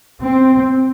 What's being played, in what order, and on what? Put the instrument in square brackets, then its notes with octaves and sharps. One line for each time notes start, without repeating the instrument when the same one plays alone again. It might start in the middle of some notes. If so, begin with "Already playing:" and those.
[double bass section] C4